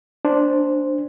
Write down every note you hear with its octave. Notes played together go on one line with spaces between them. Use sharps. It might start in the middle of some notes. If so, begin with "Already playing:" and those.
D4 C5